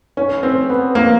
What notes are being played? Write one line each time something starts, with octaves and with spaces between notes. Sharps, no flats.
C#4
C4
B3
A#3